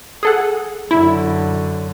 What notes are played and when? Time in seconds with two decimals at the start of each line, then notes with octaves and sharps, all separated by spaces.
0.23 G#4 A4 F#5
0.91 F#2 D3 E4